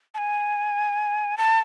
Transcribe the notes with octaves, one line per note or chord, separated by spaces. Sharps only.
A5
G#5
A5